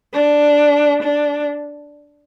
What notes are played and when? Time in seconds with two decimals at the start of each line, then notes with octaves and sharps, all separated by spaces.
0.14 D4
1.03 D4